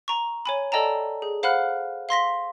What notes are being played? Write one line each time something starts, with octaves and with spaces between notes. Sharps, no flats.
A#5 C#6
C#5 G#5 B5
A4 D5 D#5 G5 A5 A#5
G#4
C5 F5 F#5 B5 F6 F#6
F5 C6 A#6 B6